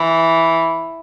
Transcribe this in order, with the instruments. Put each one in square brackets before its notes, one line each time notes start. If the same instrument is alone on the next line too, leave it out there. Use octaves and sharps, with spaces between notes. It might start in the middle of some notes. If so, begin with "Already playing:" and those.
Already playing: [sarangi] E3